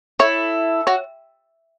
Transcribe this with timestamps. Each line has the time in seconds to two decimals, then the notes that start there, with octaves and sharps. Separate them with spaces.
0.19 E4 A4 C#5
0.87 F#4 C#5